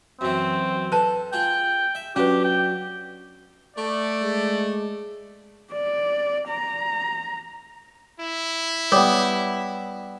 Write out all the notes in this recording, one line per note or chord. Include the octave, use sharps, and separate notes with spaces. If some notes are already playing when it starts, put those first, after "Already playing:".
F#2 E3 C4
A4 B4 A5
F4 G#4 G5
E5
F#3 C#4 D4 G4 B4
G5
A3 D5
G#3
D5
A#5
E4
G3 B3 C#5 D6 D#6